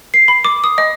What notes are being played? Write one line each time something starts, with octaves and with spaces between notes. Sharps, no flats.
C7
B5
D6
D#6
D#5